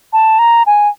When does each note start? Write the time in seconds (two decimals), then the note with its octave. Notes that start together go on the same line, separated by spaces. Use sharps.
0.13 A5
0.39 A#5
0.66 G#5